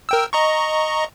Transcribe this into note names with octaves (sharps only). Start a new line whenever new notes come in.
A#4 G5 E6
D#5 A#5 C#6